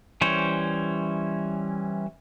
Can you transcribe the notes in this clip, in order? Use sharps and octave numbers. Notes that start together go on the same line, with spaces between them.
E3 G3 C#4 C5 C#5